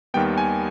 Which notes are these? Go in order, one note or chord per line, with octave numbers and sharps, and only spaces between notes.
D#2 D#3 G3 B3 G5
G#5